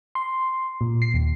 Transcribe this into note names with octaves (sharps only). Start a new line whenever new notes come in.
C6
A#2
C7
D#2